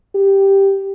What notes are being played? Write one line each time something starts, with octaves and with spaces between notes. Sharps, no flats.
G4